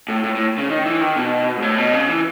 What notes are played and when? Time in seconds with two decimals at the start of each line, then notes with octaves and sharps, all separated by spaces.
0.08 A2
0.24 A2
0.35 A2
0.58 C#3
0.70 D#3
0.86 E3
1.01 D#3
1.17 B2
1.57 G#2
1.62 A2
1.78 B2
1.93 C#3
2.09 E3